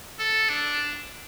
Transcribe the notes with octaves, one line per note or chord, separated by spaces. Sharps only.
A4
D4